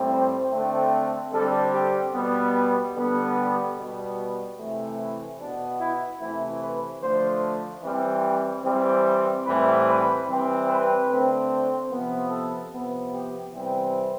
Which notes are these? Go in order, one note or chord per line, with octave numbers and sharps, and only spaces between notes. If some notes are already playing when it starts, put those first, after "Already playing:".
Already playing: A2 G3 C4
C5
D3 A3 C4
D3 G3 C4 A4
G4
B2 G3 B3
G4
D3 G3 B3
G4
B2 G3 B3
C3 E3 A3
E4
B2 B3 D4
E4
C3 E3 A3 C4 E4
B4
D3 F3 A3 C5
E3 G3 C4
E3 G3 C4
A2 E3 G3 C4 B4
B4
E3 G3 C4
B4
D3 A3 C4
C3 F3 B3
A4
C3 F3 B3
G4
C3 E3 G3 C4